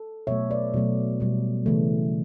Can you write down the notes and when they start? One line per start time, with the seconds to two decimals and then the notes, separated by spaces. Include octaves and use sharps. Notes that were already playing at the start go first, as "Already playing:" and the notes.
Already playing: A4
0.27 B2 F#3 A3 C#5 E5
0.51 B4 D5
0.74 B2 F#3 A3
1.20 B2 G3
1.66 C#3 E3 A3